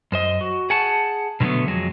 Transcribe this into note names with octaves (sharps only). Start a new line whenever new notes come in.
F#2 C5 D#5
F#4
G#4 F#5 A5
B2 D3 F#3 A3 B3
F2 F#3 G#3